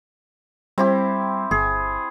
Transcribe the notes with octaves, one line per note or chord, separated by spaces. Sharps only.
G3 C4 E4 G4
G1 G#4